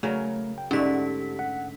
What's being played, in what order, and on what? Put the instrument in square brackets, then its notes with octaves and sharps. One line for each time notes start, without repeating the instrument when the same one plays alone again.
[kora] C#3 F#3 A#4 [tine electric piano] A3
[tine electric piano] G5
[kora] G#2 D3 A3 [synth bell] C#4 B6 [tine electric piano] G4
[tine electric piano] F#5